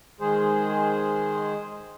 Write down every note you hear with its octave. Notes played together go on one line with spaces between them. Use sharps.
D#3 G#3 G#4 C5